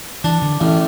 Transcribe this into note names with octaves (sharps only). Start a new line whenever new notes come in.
E3 D4
D3
A1 E3